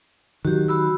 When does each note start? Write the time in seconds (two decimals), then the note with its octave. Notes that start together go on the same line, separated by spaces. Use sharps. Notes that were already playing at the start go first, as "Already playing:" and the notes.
0.45 D#3 F#3 F#4 G4
0.68 F#4 B5 E6